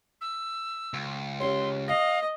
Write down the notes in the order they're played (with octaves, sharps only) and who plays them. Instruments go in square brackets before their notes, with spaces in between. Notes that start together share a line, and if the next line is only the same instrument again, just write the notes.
[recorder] E6
[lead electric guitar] C#2
[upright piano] C#4 G4 C#5 [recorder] C6
[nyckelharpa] D#5 [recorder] F5 [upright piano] A#6